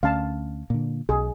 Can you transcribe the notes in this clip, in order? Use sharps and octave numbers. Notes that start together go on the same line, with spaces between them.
D2 C#4 F5 A5
A#2 D3
B1 G#4